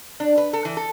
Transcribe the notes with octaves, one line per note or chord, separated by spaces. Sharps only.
D4
B4
A4
E3
A4